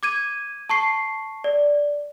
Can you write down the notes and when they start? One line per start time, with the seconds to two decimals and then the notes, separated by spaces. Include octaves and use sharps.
0.03 D6 G#6 D#7
0.70 A5 C#6 C7
1.44 D5